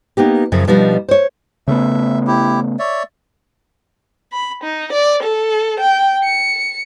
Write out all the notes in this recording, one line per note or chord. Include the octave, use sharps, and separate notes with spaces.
A#3 B3 D#4 G4
F#2 C#3 F3
B2 F3 G3 D4 D#4
C5 C#5
C#3 A3 B3 E5
E4 G4
C#5 D5 E5
B5
D#4
D5
A4
G5
C#7